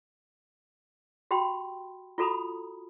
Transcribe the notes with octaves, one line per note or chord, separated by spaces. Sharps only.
F#4 G4 G5 B5 C6
F4 F#4 A4 A#5 B5 D#6